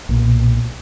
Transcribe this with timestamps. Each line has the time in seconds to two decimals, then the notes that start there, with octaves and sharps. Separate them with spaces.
0.09 B1 A#2